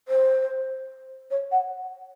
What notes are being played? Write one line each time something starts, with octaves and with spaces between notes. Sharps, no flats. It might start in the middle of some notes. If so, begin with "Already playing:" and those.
C5
C#5
F#5